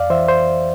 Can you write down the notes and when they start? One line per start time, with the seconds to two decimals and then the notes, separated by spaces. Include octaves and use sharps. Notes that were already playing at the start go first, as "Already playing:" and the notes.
Already playing: F2 D5 F5
0.10 E3 C5 E5
0.28 C5